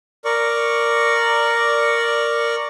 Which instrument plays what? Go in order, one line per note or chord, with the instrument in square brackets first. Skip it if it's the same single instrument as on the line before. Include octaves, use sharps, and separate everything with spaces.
[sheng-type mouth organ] A#4 D5 C#6